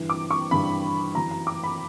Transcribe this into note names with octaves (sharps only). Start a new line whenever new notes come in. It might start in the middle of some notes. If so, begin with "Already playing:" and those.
Already playing: G2 E3
D6
C#6
G2 E3 B5
F#2 E3 A#5
A#5
D6
B5